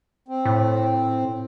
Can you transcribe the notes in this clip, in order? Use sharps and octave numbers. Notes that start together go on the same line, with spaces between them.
C4
A2